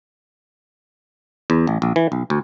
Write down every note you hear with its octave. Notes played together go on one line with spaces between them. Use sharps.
E2
A1
A#1
E3
B1
D2